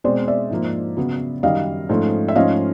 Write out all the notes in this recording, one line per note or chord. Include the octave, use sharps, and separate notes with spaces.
B2 G#3 C4 C5 D5
D5 E5
G#2 F3 A#3
C#3 F#3 B3
F#2 D#3 G3 D#5 F5
G#2 F3 A3 C#4
E5
G#2 F3 A3 C#4 D#5 F5